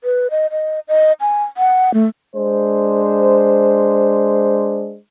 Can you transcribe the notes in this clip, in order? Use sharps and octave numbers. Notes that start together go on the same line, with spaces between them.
B4
D#5
D#5
D#5
G#5
F#5
A3
G#3 D4 C5